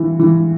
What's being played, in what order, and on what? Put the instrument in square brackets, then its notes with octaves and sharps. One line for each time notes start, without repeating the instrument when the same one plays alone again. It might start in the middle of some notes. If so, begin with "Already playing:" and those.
Already playing: [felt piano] E3
E3